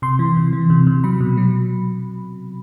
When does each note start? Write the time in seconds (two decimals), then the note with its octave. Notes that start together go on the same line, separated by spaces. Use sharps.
0.02 C3 C6
0.19 E3
0.37 C3
0.53 E3
0.70 C3
0.87 C3
1.04 F#3 B5
1.21 B2
1.37 F#3